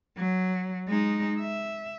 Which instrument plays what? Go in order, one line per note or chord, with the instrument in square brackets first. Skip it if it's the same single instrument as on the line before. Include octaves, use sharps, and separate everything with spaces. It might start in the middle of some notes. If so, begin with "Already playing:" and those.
[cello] F#3
G#3 D#4
E5